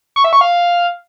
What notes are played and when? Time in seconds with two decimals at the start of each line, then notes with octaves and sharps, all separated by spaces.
0.16 C#6
0.24 E5
0.33 C#6
0.41 F5